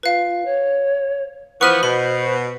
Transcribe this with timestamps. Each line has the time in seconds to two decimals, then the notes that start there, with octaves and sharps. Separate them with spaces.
0.03 F4 B4 F5
0.45 C#5
1.61 E3 F3 B3 C5 C#6 F6 D#7
1.83 B2 B5